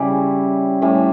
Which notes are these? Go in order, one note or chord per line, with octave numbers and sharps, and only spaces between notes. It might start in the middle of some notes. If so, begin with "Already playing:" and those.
Already playing: C#3 G3 C#4 E4
A2 G3 C#4